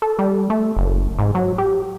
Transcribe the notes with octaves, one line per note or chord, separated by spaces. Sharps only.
A4
G3
A3
F#1
G#2
F#3
G4